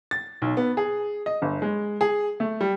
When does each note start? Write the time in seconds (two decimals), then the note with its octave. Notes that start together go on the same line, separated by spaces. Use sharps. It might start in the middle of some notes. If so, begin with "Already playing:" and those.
0.11 A6
0.42 B1
0.57 B3
0.77 G#4
1.26 D#5
1.42 G1
1.62 G#3
2.01 G#4
2.40 A3
2.61 G3